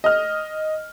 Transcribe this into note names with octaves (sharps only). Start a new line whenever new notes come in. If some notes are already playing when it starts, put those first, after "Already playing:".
D#5 F6